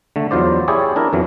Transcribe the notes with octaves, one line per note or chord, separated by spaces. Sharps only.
D3 A3
E2 F#3 F4 C5 D5
E4 G4 G#4 C#5 D5
D4 E4 A#4
F2 E3 F#3